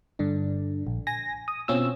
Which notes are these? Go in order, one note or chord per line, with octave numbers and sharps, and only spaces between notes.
G2 D3 D4
A#1
G#5 A#6
D#6
B2 C4 C#4 F4 E6